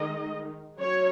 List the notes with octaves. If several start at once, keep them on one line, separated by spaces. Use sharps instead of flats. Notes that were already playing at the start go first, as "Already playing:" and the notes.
Already playing: D#3 G#3 D#4 D#5
F#3 C#4 C#5